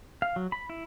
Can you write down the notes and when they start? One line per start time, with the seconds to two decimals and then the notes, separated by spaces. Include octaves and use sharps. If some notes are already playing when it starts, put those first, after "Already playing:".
0.22 F5
0.36 F#3
0.52 B5
0.70 E4